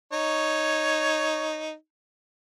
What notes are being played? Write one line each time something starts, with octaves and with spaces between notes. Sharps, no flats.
D#4 C#5